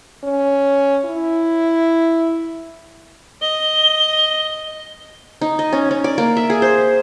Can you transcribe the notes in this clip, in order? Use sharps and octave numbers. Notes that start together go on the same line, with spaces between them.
C#4
E4
D#5 G7
D#4
D#5
C#4
C#4
D5
A#3
E5
G#4
C5